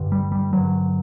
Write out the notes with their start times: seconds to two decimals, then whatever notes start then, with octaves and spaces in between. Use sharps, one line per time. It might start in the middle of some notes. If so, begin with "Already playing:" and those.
Already playing: G2 D3
0.12 G3
0.32 G3
0.53 G2 D3 F#3